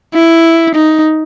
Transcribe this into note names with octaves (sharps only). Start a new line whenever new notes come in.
E4
D#4